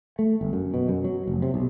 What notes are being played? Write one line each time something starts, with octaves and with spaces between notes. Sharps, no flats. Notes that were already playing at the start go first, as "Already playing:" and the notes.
A3
G1
F#2
B2
F#2
F#3
F1
C3
B1